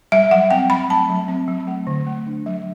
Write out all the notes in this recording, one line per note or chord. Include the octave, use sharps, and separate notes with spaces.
G3 E5
F#3 F#5
C4 G5
F#3 B5
A3 A5
F#3
C4
F#3
A3
D3
A3
D4
F#3